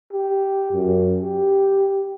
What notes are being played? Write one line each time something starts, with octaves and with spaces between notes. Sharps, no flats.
G4
F#2
G4